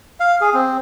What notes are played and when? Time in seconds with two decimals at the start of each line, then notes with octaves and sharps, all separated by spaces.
0.20 F5
0.41 G#4
0.54 C4